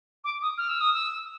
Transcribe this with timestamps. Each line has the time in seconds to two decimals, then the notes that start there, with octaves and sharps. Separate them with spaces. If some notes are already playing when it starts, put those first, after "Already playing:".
0.24 D6
0.42 D#6
0.57 F6
0.69 E6
0.80 D#6
0.93 E6